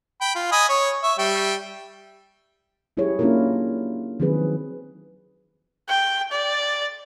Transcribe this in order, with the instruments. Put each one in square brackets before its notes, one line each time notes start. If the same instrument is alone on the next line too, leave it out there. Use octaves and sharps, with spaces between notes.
[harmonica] G5 B5
F4
D#5 G#5 B5
C#5
E5 C#6
G3 E5 G5
[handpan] F#3 E4 G4 G#4 C#5
A#3 C#4 D4 E4 F4 A#4
D#3 F3 F#3 C4 G#4 B4
[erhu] G5
D5